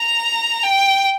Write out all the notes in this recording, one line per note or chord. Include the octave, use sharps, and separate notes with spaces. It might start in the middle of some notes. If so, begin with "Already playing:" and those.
Already playing: A#5
G5